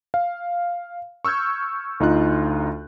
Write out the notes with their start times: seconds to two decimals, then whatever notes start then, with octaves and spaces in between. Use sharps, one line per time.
0.14 F5
1.25 C#6 E6 F6 G6 G#6
2.00 D2 D#4 F4 F#6